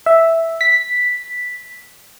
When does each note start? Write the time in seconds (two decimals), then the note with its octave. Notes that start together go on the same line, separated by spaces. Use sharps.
0.06 E5
0.61 B6